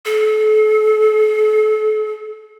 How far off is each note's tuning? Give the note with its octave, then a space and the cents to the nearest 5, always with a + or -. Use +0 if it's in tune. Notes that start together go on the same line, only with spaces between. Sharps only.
A4 -35